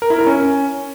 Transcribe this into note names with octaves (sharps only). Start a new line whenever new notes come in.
A#4
E4
A#4
C#4